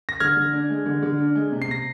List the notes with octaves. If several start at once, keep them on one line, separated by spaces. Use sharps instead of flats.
A#6
D3 F6 G#6
D3
D4
G#3
D3
D3
D4
G#3
C3
C7
C3 A#6